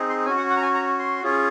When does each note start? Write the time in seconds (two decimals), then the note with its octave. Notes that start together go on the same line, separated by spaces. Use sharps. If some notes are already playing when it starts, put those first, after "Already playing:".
Already playing: C4 D#4 G#4
0.09 C6
0.25 C#4 G#5
0.29 F#4
0.37 F#5
0.50 F#5
0.57 A#5
0.62 G#5
0.74 A#5
0.99 C6
1.23 C#4 F4 G#4